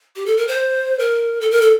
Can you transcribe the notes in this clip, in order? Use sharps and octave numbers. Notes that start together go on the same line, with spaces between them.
G4
A4
A#4
C5
A#4
A4
A#4
A4